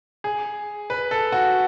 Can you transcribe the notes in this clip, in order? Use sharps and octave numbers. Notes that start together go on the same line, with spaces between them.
G#4
B4
A4
F#4